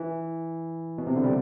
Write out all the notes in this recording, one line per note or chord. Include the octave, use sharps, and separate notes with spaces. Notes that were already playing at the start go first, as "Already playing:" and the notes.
Already playing: E3
B2
C3
D3
G3